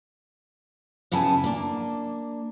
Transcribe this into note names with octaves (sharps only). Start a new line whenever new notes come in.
F#2 C#3 B3 E4 G#5 A5
A#3 D4